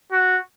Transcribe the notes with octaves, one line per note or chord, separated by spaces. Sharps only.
F#4